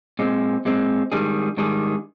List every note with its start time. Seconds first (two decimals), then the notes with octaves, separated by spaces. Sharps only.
0.19 A#2 G#3 C4
0.65 A#2 G#3 C4
1.12 G#2 D#3 G3 D4 G#4
1.57 G#2 D#3 G3 D4 G#4